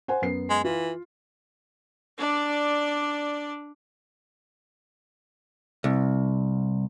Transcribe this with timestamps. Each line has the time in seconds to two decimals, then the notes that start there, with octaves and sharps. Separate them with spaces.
0.08 C5 F#5 G#5
0.22 F#2 B3 C7
0.50 G#3
0.64 E3 F4
2.19 D4 D5
5.84 C2